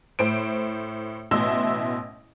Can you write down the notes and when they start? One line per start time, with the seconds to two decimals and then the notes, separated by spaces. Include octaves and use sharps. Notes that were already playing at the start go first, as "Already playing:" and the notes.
0.19 A2 C5 D7
1.31 A1 B2 E4 E5 C6 E6